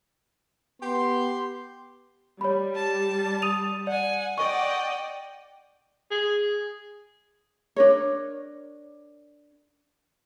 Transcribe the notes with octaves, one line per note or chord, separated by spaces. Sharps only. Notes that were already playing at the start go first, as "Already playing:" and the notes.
B3 G4 C6
G3 C#5 B5
A5
D#6 D#7 F7
D5 F#5 G#5
D5 D#5 F#5 G5 C#6
G#4
D4 A#4 C#5